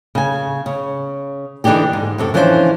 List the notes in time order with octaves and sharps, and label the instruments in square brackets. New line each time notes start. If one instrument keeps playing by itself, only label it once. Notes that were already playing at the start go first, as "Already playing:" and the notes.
[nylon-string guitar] C#3 G#5
C#3
D3 E3 D4 D#4 G4 G#4
G#2
F#2 C3 A4
E3 F3 C#4 D4 G4 C5